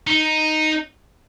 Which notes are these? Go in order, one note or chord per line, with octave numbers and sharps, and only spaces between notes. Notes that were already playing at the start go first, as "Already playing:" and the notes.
D#4